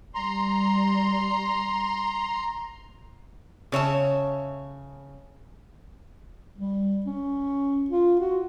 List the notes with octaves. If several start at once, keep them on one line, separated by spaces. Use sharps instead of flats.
G3 A#5 C6
C#3 C#5 E5 A5
G3
C#4
F4
F#4